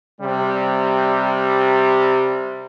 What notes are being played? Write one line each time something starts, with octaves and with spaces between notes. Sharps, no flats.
C3 G3